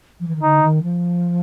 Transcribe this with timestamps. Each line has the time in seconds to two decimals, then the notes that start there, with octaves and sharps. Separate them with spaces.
0.20 F3
0.27 E3
0.35 D#3
0.43 D3 D#4
0.63 D#3
0.82 F3